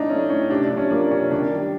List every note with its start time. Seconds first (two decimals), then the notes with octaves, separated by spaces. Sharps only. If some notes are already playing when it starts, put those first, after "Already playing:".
Already playing: A2 E3 D4 D#4
0.09 A3 C#4
0.30 A2 C#4
0.50 C3 D4
0.64 D4
0.71 F3
0.77 C#4
0.90 A#3 D4
1.11 C3 C#4
1.31 D#3 D4
1.52 G3